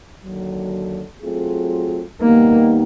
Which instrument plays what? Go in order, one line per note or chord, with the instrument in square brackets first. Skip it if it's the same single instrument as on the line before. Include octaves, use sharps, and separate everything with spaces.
[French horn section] D#2 D3 F#3
F#3 A3 C4 F4 G#4
[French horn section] D#2 D#3 G3 B3 D#4 [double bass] A#3